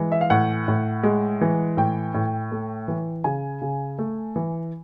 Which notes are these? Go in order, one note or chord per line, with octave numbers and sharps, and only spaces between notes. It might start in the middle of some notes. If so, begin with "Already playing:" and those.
Already playing: E3 G#3
E5
F5
A2 F#5
A2
G#3
E3
A2 G5
A2
A3
E3
C#3 G#5
C#3
A3
E3